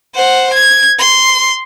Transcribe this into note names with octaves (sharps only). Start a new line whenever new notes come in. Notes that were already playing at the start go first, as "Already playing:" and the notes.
C5 F#5
G#6
C6